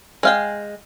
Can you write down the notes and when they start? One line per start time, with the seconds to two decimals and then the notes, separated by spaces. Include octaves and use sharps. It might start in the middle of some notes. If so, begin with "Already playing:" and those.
0.23 G#3 F5 G5